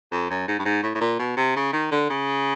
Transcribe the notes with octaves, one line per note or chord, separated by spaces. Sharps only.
F2
F#2
G#2
G2
G#2
A2
A2
A#2
B2
C3
C#3
D#3
D3
C#3